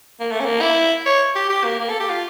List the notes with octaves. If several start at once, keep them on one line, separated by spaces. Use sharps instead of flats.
A#3
A3
C#4
A#3
E4
C#5
G4
G4
A#3
A#3
A4
G4
F4